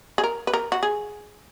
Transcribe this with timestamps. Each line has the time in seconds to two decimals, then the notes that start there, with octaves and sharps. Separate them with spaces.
0.18 G#4
0.24 A#4
0.47 B4
0.54 A#4
0.72 F#4
0.83 G#4